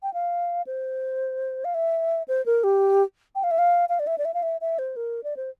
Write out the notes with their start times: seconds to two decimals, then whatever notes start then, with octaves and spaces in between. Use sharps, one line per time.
0.03 G5
0.14 F5
0.67 C5
1.65 F5
1.74 E5
2.28 C5
2.46 A#4
2.64 G4
3.35 G5
3.43 F5
3.51 E5
3.58 F5
3.89 F5
3.99 D5
4.07 E5
4.18 D5
4.25 E5
4.34 F5
4.43 E5
4.61 E5
4.79 C5
4.96 A#4
5.24 D5
5.37 C5